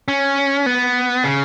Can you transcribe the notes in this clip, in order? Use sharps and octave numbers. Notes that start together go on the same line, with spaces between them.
C#4
B3
C#3